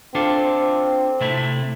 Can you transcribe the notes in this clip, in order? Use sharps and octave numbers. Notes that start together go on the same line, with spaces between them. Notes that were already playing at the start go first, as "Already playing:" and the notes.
C4 D4 F4 A4
C3 A3 E4